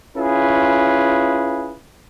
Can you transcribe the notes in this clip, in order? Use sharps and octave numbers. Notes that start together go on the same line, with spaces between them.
C#4 E4 F4 G#4 B4